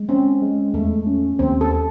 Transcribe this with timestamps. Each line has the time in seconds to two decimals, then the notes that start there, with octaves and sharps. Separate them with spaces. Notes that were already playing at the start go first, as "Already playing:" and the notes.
Already playing: G#3
0.09 C4 C#4
0.42 G#3
0.74 E2 A3
1.07 C#4
1.39 D#2 C4
1.61 A4